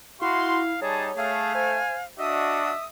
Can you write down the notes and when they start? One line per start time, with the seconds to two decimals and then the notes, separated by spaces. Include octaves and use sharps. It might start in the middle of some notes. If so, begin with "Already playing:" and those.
0.22 E4 F#4 F5 C6
0.82 G3 D#4 G#4 C#5 A5
1.17 A3 G#4 F5
1.55 C5 G#5
2.19 D4 F#4 D#5 E5 D#6